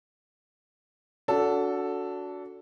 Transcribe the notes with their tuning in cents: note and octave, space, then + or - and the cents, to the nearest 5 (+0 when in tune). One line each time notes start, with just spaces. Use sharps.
D4 -35 F#4 -10 A4 +0